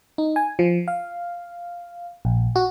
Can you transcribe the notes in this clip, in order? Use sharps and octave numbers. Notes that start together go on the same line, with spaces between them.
D#4
G#5
F3
F5
A#1
F#4